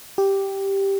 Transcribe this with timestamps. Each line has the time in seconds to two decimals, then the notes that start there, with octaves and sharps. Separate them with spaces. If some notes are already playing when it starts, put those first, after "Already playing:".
0.18 G4